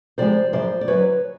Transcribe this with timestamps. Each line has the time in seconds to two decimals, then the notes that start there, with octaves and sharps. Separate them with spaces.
0.18 F2 C3 F3 G#3 C5 D5
0.53 F#2 C#3 F3 C5 D5
0.81 D5
0.88 F#2 D3 F#3 B4 C#5